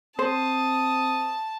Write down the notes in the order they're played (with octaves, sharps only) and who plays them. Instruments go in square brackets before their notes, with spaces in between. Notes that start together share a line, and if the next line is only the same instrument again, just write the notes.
[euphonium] C4 [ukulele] C5 [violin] A5 [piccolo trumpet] D#6